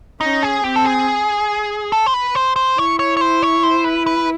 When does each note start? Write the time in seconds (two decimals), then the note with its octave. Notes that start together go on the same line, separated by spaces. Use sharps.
0.21 C#4 D#4
0.43 G#4
0.63 C4 G4
0.76 A4
0.85 G#4
1.92 A4
2.06 C5
2.14 B4
2.35 C5
2.56 C5
2.78 E4 C#5
2.99 C#5
3.17 C#5
3.21 C5
3.43 C#5
3.63 C5
3.84 B4
4.07 B4